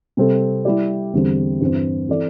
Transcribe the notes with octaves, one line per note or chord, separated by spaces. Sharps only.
C3 G3 C4 A4
G3 E4 G4 D5
E2 D3 G3 C4
G2 E3 C4
E3 C4 A4 D5